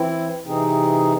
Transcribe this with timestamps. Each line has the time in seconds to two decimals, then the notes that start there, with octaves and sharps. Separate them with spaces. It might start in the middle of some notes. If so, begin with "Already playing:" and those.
Already playing: E3 C4 E4
0.45 C3 E3 C4 D#4 G#4